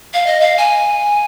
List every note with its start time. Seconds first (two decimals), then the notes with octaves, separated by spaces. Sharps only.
0.14 F5
0.27 D#5
0.40 F5
0.58 G#5